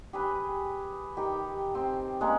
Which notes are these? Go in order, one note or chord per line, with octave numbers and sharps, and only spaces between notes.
G4 G#4 B4
D#3 G4
C4
G#3 A#3 C#4